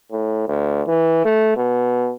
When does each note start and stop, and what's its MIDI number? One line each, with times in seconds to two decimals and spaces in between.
0.12 0.44 45
0.47 0.82 38
0.87 1.22 52
1.25 1.55 57
1.57 2.13 47